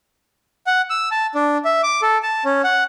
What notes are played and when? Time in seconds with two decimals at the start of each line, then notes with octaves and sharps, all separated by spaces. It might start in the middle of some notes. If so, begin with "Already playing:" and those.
0.67 F#5
0.90 E6
1.11 A5
1.35 D4
1.65 E5
1.83 D6
2.02 A4
2.23 A5
2.45 C#4
2.64 F#5